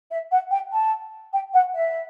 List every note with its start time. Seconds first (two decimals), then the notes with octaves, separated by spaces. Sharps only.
0.11 E5
0.31 F#5
0.51 G5
0.72 A5
1.33 G5
1.54 F#5
1.75 E5